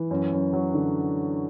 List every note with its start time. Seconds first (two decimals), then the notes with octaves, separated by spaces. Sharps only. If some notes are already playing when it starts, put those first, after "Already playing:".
Already playing: E3
0.11 F#2
0.32 F#2
0.53 F#3
0.74 D3